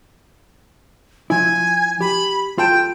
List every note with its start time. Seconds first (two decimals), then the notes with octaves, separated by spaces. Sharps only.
1.30 F3 E4 G#5
2.01 G4 B5
2.58 F4 A4 G5 A5